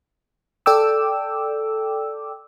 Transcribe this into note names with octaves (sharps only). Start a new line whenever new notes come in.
A4 D5 G5 D6 E6